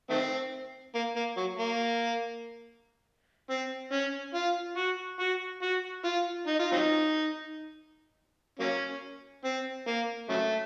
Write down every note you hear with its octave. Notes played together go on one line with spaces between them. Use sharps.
D#3 A3 C4
A#3
A#3
F#3
A#3
C4
C#4
F4
F#4
F#4
F#4
F4
D#4
F4
F#3 C4 D#4
F#3 A#3 C#4
C4
A#3
C#3 F#3 A3